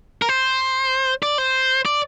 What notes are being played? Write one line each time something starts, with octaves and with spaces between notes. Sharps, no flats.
A#4
C5
D5
C5
D5